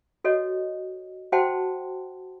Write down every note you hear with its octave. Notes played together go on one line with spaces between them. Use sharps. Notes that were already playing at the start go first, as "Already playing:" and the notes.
F#4 A4 C#5 D#5
F#4 C5 F#5 G5 A5 C6